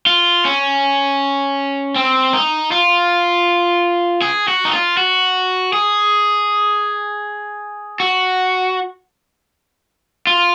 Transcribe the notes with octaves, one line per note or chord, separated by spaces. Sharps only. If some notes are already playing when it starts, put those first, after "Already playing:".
F4
C#4
C4
D#4
F4
G#4
F#4
D#4
F4
F#4
G#4
F#4
F4